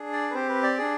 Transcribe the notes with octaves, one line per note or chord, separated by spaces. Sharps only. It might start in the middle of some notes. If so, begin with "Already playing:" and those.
Already playing: D4 G#4
D5
B4
C4 G4 C5
B4
D5
D4 G#4